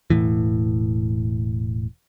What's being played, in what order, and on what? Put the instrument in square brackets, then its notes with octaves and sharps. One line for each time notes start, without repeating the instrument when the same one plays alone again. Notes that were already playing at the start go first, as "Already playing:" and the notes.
[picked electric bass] E1 A#1 A2 E3